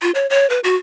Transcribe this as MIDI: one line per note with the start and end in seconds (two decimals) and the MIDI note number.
0.02 0.11 65
0.15 0.27 73
0.30 0.49 73
0.50 0.60 71
0.64 0.76 66